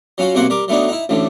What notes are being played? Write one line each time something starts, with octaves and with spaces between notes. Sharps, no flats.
F#3 C#4 F4 F#4
B1 C3 A#3 F#4 F#5 C6
G3 A#4 D6
F#3 A3 B3 D4 D#4
D#4 E4
A1 D2 A2 D3